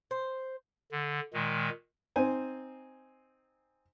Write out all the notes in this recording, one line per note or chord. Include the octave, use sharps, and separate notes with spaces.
C5
D3
A#2 D#3 G#3
C4 D#4 C5 G#5